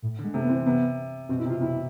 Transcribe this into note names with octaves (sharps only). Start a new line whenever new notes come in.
A2
D3 G#3
C3 A3
B3
E3 C4
C3 B3
B2 C4
E4
C3 F4
C3 E4